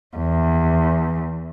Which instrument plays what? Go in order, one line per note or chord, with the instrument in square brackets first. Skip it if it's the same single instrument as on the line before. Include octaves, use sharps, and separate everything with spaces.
[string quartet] E2